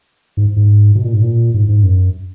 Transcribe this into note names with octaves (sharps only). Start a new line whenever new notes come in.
G#2
G#2
B2
A#2
G#2
A#2
G#2
G#2
F#2